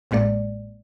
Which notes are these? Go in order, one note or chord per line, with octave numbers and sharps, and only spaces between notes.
A1 A2 G#3 A#3 D5